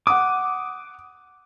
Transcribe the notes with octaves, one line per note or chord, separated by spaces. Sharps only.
F#5 D6 D#6